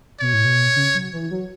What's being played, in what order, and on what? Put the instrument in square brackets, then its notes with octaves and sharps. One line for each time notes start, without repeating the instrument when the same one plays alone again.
[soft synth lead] B2 [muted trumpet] C#5
[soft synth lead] A2
B2
C#3
F#3
E3
F#3